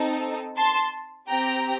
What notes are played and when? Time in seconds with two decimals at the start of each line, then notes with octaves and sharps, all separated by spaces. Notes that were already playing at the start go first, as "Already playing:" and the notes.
Already playing: C4 D#4 A4
0.57 A5 C6
1.29 C4 G4 G5 A#5